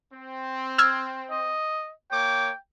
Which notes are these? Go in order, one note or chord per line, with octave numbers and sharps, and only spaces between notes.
C4
E6 F6 G#6
D#5
A#3 C#5 G5 D6